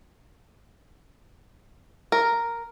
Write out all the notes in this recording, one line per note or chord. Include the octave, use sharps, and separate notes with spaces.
A#4